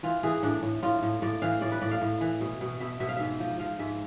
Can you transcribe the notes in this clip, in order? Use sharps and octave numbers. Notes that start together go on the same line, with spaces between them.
E3 F4
E3 G#4
A2 D4
A2
A2 F4
A2
A2 D5
E3 F5
A2 D5
B4
A2 D5
F5
A2
E3
B2
B2
B2 E5
B2 E5
F5
G#2 E5
F3
F3 F5
G#2 E5